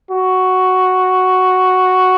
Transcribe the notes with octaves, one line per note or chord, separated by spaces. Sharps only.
F#4